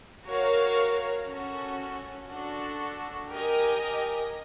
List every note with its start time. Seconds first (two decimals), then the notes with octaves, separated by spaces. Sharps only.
0.25 F#4 A#4 C#5 F5
1.27 C#4 F#4 A4
2.30 D4 F#4 A4
3.32 G4 A#4 D#5 G#5